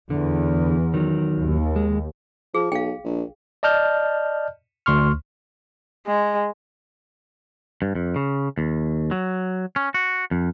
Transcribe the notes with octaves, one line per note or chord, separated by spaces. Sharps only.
E2 D3
D#3 F#3
D#2
G#3
F3 G#4
B1 F5 G5
A#1
D5 D#5 A5 F6 G6
D2 C6 C#6 F6
G#3
G2
F2
C#3
D#2
F#3
C#4
F#4
F2